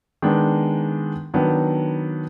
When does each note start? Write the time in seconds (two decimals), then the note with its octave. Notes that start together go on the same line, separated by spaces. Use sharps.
0.22 D#3 G#3 B3 D4
1.34 D#3 F#3 B3 D4